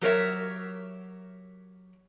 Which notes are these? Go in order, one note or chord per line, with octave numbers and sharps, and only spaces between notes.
F#3 G4 A#4 C5 C#5 E5